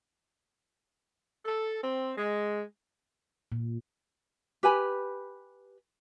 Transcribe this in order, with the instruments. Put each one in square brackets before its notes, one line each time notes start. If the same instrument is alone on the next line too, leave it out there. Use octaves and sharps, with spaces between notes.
[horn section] A4
C4
G#3
[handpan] A#2
[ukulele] G4 B4 G#5 B5